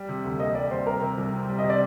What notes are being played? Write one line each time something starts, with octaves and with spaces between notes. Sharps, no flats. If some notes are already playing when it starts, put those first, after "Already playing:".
Already playing: G3
C3
D2
A#3 D#5
G3 D5
C3 C5
G3 A#4
C3
C2
C4
G3
D#5
C3
D5